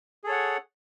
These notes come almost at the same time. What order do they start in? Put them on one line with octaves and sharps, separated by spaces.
G#4 A4 C#5 F#5